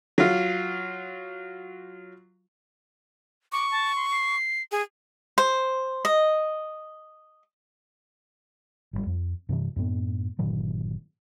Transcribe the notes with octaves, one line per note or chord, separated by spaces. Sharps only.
F#3 F4
C#6 D6
A5
C6
C7
G#4
C5
D#5
G#1 D#3 G3
F2
G2 C3 E3
F#2 A2 B3
G1 A#2 D#3 F#3